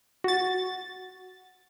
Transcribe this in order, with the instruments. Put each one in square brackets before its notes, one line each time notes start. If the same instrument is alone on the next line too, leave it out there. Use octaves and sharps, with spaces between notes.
[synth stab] F#4 A6